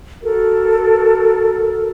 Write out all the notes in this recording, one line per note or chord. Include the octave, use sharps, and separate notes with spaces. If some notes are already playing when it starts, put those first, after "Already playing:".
F#4 A4 A#4